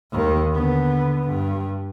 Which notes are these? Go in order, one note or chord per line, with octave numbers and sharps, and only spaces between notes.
D#2 D#3
D3 B3
G2